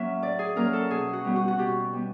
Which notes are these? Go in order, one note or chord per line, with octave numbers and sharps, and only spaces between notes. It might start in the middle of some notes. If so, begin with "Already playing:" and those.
Already playing: F#3 A#3 C#4 E5
A2 D5
G#4
F#3 A#3 C#4 A#4
A4
B2 G#4
F#4
G3 B3
F#4
F#4
B2 G4
G3 B3